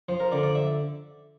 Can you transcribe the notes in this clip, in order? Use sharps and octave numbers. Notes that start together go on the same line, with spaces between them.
F3 C5
A#4
D3 D5
D5
E5